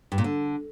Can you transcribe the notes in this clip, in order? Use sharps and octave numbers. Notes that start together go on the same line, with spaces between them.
G2
A#2
D3